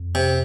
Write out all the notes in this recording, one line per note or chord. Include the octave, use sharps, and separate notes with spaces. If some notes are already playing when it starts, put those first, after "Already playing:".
Already playing: F2
C3